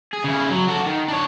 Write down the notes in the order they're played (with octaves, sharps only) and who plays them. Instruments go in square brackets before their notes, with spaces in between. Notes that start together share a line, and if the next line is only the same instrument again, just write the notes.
[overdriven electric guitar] G#4
C#3 E4
F#3
F#4 A4
D#3
D4 C#5